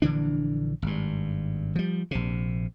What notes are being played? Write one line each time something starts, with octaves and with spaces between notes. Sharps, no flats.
A#1 D3 E3 D4
G#1 G2
F3 G3
A#1 C3